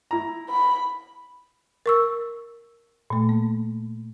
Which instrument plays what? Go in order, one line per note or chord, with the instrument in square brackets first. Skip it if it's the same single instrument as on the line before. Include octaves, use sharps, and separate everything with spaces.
[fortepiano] E4 A#5
[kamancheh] B5
[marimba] A#4 C#6 E6
A#2 A3
A#3